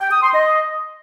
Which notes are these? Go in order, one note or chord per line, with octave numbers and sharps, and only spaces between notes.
G5
D#6
C6
D#5